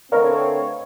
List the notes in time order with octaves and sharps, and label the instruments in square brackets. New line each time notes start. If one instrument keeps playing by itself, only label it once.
[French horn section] D3 A3 C4 [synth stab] A#4 [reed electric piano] B4 D#5 F5 [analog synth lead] C#5